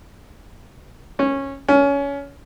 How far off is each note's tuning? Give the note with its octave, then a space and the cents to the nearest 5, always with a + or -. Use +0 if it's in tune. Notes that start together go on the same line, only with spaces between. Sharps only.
C#4 -15
C#4 +20